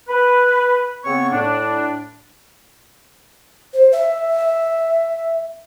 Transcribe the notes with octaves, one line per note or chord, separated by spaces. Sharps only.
B4
C#3 B3 C4 C#5 C#6
A2 D4
C5
E5